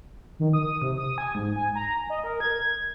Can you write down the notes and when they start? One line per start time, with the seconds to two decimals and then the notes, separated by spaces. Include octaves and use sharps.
0.40 D#3
0.53 D#6
0.82 C3
0.98 D#6
1.18 G#5
1.35 G#2
1.56 G#5
1.75 A#5
2.10 D#5
2.24 A#4
2.40 G#6